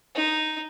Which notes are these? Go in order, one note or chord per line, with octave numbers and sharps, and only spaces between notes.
D#4